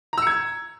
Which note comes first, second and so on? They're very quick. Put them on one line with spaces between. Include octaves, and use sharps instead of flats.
A#5 E6 C#7 G#6